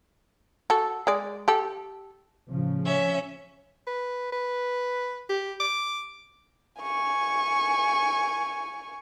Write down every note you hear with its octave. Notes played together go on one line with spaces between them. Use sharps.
F#4 A4
G#3 D5
G4 A4
A2 C#3 F3
C#4 E5
B4
B4
G4
D6
G#5 C#6